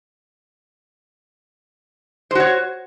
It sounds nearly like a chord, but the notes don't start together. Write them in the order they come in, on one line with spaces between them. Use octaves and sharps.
C5 F#4 C#5